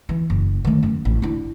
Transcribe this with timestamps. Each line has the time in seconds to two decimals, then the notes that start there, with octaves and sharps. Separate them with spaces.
0.09 E3
0.30 F#1
0.65 D#3 A3
0.83 F#2
1.05 A1
1.22 D4 E4